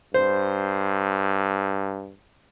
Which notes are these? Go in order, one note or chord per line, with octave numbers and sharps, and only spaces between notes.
G2 C5